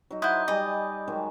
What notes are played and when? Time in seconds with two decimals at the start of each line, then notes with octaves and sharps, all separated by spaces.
0.11 F#3 D#4
0.22 E4 C5 F#5 D#6 G6
0.48 G3 D5 D#5 G#5
1.08 D#3 F#3 G#3